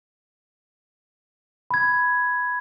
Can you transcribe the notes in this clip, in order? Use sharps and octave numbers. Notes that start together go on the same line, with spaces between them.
B5 G#6